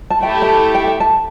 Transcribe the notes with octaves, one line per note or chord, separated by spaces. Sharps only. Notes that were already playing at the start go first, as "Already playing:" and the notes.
A5
A3 E4 G4 G5
A5
G5
G5
A5